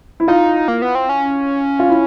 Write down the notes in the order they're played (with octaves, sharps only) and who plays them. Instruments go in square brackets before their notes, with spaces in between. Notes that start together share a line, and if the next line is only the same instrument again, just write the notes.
[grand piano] E4
[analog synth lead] D#4 [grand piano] F4
[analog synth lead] A#3
B3
C4
C#4
[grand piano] F4
E4